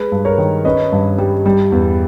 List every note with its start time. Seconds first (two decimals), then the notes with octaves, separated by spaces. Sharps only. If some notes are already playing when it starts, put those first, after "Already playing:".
Already playing: G#3 B4
0.12 G2
0.25 A#4 C#5
0.38 D#3
0.65 C#4 B4 D#5
0.92 G2
1.18 G3
1.46 G3
1.72 E2